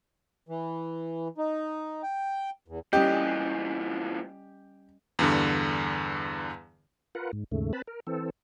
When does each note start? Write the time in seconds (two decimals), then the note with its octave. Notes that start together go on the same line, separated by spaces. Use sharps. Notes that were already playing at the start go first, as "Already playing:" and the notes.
0.49 E3
1.37 D#4
2.03 G5
2.68 E2
2.93 A#2 E3 G3 C#4 G4 D#5
5.19 E2 G2 D3
7.15 F4 A#4 B4 F#5
7.33 G#2
7.51 D#2 G#2 C#3 A3
7.73 C4 B4 A5 B5
7.88 A#4
8.07 E3 C4 A4